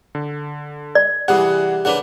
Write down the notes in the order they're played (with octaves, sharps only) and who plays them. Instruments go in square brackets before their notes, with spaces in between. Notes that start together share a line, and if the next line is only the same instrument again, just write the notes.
[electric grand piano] D3
[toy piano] D5
[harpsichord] C3 G3 [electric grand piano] E3 G#4 F#5
[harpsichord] C#3 A#3 D4 [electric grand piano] B4 F#5